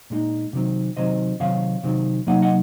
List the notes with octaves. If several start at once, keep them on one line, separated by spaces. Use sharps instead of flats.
A#2 G#3 D#4
C3 D#3 F#3 C4
C3 D#3 F#3 C4 C5 D#5
C3 D#3 F#3 C4 C#5 F5
C3 D#3 F#3 C4
C3 F#3 A#3 D#4 D#5 F#5
D#5 F#5